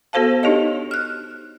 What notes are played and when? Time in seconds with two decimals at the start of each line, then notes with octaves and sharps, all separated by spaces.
0.13 B3 F#4 A4 C5 F5 A5
0.43 D4 D#4 G4 C#5 D#5
0.91 F6 F#6